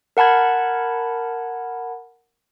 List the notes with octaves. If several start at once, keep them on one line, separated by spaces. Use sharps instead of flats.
A#4 F#5 A5 B5 G#6